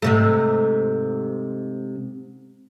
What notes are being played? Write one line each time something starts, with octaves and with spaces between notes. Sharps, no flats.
G#2 C3 A3